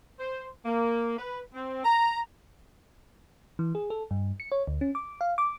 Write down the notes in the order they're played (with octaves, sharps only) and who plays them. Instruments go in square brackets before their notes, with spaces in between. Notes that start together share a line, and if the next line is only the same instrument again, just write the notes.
[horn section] C5
A#3
B4
C4
A#5
[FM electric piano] E3
G#4
A4
G2
C#7
C#5
D2
C#4
D6
F5
D6